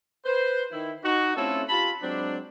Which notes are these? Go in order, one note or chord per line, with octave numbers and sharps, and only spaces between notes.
B4 C5
D#3 E4
D#4 F#4
A3 C4 C#4 E4 F4 A4
F4 G4 A5 B5
F#3 G#3 C4 D4